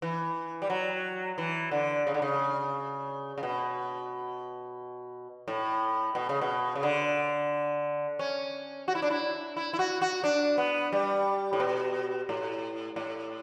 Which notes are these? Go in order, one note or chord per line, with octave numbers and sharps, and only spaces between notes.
E3
G3
F#3
E3
D3
C#3
D3
C#3
C#3
B2
A2
B2
C#3
B2
C#3
D3
C#4
F#4
E4
D4
E4
E4
E4
F#4
F#4
D4
B3
G3
A2
B2
A2
A2